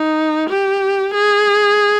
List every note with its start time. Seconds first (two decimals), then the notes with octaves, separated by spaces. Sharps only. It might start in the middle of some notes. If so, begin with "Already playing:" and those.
Already playing: D#4
0.50 G4
1.14 G#4